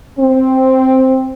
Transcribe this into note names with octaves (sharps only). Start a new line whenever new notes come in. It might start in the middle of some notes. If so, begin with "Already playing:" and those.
C4